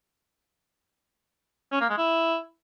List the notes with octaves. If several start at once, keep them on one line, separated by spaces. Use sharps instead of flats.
C#4
A#3
G#3
E4